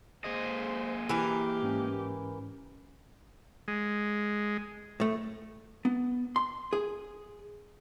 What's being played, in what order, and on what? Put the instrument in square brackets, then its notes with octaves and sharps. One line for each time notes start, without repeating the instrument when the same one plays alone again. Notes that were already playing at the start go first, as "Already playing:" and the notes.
[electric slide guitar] A#3 G#4 D#5 [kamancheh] C5
[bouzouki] E3 A#4 [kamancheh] G4
[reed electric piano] G#2 C#4
[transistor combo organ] G#3
[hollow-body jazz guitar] A2 A3
B3
C6
G#4